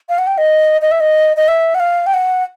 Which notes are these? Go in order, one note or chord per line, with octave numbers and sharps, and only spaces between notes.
F5
F#5
G5
D#5
D#5
E5
D#5
D#5
E5
F#5
F5
G5
F#5